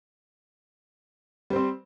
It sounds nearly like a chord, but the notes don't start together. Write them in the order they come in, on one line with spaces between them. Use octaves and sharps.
G3 C5 C4